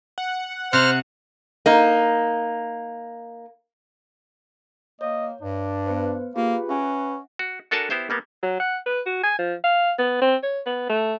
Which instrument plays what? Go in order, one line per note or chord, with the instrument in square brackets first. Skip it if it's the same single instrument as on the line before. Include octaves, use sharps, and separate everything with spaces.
[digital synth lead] F#5
[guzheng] C3 [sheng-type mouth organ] C5 F6 [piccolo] F#6
[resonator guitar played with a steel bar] A#3 D#4
[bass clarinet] A#3 [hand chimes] C#5 [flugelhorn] D#5
[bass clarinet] G2 [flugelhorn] D4
[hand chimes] B3 B4 C5
[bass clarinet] A#3 [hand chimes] F4 G4 G#4 [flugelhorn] B4
[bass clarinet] C#4 [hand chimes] E5 F#5 G#5
[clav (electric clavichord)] F#4
D4 F#4 A4 A#4 G#5 A5
B3 E4 G4 C5 E5
G3 A#3 B3
[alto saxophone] F#3
F#5
B4
F#4
G#5
F3
F5
B3
C4
C#5
B3
A3